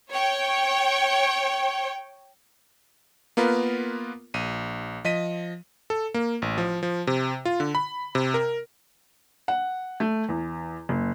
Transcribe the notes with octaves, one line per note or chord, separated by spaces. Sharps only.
C#5 G5
A#3 B3 F4 A#4 B4
A#1 D#7
F3 D#5 B6 D#7
A4
A#3
A1
F3
F3
C3
F4
D3
B5
C3
A#4
F#5
A3
E2
F#1